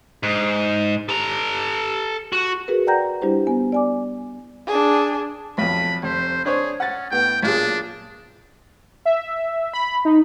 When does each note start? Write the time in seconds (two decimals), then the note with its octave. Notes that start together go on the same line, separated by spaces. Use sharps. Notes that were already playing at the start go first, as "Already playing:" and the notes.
0.23 G#2
1.09 A4 A#5
2.33 F#4
2.68 F#4 G#4 A#4 B4
2.87 D5 F#5 G5 A#5 G6 A#6
3.22 G3 D4 E4 G4 C5
3.47 B3 G#5
3.72 D5 G#5 D6
4.68 D4 G#4
5.58 B1 F2 B5
6.03 F1 C5
6.45 D4 G#4 C5 C#5
6.80 C#4 F#5 A6
7.11 A2 B3 G5
7.43 B1 A#2 D4 G#4
9.05 E5
9.73 B5
10.05 D#4